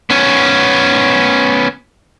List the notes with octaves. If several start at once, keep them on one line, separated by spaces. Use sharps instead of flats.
B3 C#4